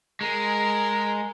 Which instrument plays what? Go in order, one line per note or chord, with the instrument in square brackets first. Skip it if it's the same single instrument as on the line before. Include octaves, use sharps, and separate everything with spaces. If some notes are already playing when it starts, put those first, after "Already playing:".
[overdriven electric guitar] G#3 [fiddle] A#4